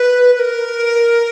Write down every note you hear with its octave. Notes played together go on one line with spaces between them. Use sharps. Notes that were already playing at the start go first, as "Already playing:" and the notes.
Already playing: B4
B4
A#4